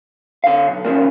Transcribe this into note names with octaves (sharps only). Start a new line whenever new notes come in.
D3 F5
B1
C#3 F3 A#3